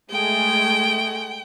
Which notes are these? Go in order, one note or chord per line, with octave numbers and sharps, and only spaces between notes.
G#3 A3 G5 G#5